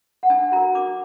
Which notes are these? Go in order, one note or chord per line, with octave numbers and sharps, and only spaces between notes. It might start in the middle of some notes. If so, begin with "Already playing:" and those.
F#5
D4 G#5
F#4 A#4 A#5
D4 D6